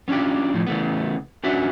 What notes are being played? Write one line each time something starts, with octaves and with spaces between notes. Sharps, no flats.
B3 C#4 D4 F4 G4
A2 F3
C#3 E3 A3 B3
C#4 D4 F#4 B4 E5 F#5